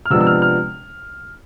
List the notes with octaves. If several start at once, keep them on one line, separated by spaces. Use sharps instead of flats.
F6
C3 F3 G#3 B3 D4 E6
E6
F6
F6